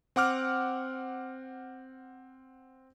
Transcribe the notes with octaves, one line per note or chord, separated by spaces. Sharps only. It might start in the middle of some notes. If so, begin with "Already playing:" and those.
C4 F#5 D6 F6